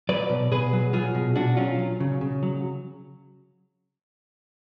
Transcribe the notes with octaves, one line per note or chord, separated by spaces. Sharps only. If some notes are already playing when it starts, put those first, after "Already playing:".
F#3 B4 D5
B2
B2 G#4 B4
F#3
F#3 F4 G#4
B2
B2 D4 F#4
F#3 C#4 F4
F#3
C#3
C#3
F#3